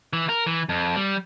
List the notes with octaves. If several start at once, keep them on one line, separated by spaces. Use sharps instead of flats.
E3
A#4
E3
F2
G3